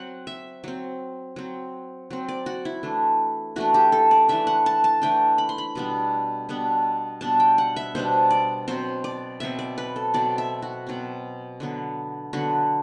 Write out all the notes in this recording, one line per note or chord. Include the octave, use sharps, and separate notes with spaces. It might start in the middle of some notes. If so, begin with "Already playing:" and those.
Already playing: F#3 C4 F#5
E5
F#3 C4
F#3 C4
F#3 C4
D5
F#4
E4
E3 A3 D4
E3 A3 D4 F#4
G4
A4
D5
E3 A3 D4 E5
F#5
A5
A5
E3 A3 D4 G5
B5
C6
B5
B2 G3 B3 D4
B2 G3 B3 D4
B2 G3 B3 D4 A5
G5
F#5
E5
B2 G3 B3 D4 C5
D5
B2 F#3 C4 C5
D5
B2 F#3 C4 E5
D5
B4
A4
B2 F#3 C4 D5
E5
F#4
B2 F#3 C4
D3 F#3 B3
D3 F#3 B3 F#4